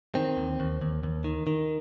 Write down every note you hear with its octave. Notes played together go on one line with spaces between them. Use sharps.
D#3 C4
D#2
D#2
D#2
D#2
D#3
D#3